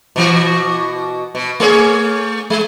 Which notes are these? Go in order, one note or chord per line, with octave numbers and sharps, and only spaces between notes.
B2 E3 F#4
B2
A3 G#4 C#5
G#3